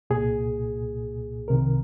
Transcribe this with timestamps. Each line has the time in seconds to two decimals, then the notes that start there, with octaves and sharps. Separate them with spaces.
0.10 C2 A#2 G#4
1.48 C2 C3 D#3 A#4